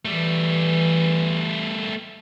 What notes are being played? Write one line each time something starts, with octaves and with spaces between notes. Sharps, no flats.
E3 G3 A3